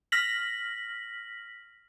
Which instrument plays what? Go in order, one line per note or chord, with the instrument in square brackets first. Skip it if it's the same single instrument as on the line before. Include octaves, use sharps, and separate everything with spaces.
[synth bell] F6 A#6 B6 F#7